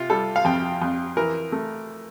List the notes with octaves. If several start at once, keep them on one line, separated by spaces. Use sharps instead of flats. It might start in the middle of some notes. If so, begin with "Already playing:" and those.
Already playing: C3 F4
G3 A4
F5
F2 G5
F2
E3 A#4
A3